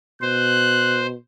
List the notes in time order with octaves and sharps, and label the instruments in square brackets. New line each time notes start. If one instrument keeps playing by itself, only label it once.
[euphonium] B2 [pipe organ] C5 [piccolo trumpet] F#6